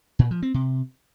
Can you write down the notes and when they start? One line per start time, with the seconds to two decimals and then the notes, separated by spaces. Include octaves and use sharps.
0.19 A#2
0.31 F3
0.42 C4
0.54 C3